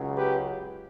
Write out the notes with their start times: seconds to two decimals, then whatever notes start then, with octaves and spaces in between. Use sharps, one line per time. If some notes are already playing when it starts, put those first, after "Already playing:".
Already playing: C#2 C#3 F#3
0.16 G4 B4